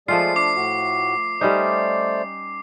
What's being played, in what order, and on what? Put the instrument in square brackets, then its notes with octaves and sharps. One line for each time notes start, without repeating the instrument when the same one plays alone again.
[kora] F3 A3 F4 [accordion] G#3 G#4 D5 [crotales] C7
[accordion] D4 [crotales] D6 C7
[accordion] A2 F#4
[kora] G3 C#4 D#4 [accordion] A3 C5 D5